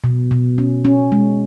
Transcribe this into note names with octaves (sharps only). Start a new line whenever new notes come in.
B2
B2
C#4
C#4
G#3